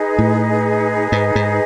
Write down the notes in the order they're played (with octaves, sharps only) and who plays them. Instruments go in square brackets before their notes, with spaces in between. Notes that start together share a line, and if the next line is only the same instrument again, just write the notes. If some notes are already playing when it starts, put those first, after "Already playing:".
Already playing: [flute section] D#4 G#4 B4 D#5
[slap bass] A2
G#2
G#2